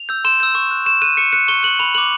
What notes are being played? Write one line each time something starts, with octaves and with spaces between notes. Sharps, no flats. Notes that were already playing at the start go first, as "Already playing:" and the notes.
Already playing: F7
E6 G6
C6 E7
E6 G6
C#6
F#6
C#6 E7
F#6 D#7
C#6 C#7
F#6 C#7
C#6 G7
F#6 F#7
B5 F7
D6 F#6 F#7